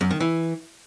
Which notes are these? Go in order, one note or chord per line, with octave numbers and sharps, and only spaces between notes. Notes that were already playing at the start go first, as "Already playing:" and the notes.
F#2
D#3
E3